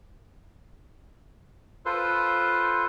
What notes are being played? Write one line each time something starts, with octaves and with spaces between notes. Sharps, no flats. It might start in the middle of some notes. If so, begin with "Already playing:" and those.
F4 A4 B4 C5 C6